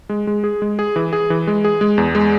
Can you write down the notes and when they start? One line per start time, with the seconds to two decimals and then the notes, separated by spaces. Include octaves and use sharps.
0.09 G#3
0.27 G#3
0.44 G#4
0.62 G#3
0.79 G#4
0.96 E3
1.13 G#4
1.30 E3
1.47 G#3
1.64 G#4
1.81 G#3
1.98 E2
2.15 G#3